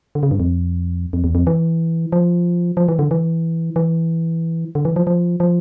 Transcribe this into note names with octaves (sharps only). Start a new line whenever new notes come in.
D3
C#3
G2
F2
F2
E2
F2
E3
F3
F3
E3
D3
E3
E3
D3
E3
F3
F3
F3